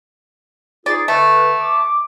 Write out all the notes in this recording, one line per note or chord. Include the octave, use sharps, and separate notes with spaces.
D#4 F4 G#4 D5
D3 A3 B4
D6